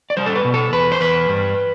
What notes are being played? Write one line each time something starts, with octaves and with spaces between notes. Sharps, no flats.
D5
G3 C5
A4
B4
B2
A4
E2 B4
C5
E2 B4
G2